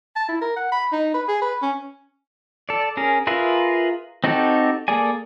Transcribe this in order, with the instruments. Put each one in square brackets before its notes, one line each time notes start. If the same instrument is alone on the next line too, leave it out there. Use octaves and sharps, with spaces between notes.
[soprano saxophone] A5
E4
A#4
F#5
B5
D#4
B4
G#4
B4
C#4
[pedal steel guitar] A4 D5
C#4 G#4 A#4
F4 G#4 A#4 B4 E5
C4 D#4 F#4 G4 A4
A#3 G#4 A4 D5 G#5